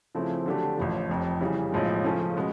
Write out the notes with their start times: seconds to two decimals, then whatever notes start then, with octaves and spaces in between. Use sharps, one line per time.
0.15 C#3 F3 A3 C4 E4
0.46 D3 F#3 A3 D4 G4
0.78 A1 A2 F3
1.09 F1 F2 C3
1.41 C#3 E3 G3
1.72 B1 A2 F3 G#3
2.04 C#3 F3 A3 C#4
2.37 B2 G#3 B3